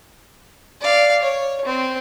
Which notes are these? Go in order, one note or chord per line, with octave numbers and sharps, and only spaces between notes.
D5 F5
C#5
C4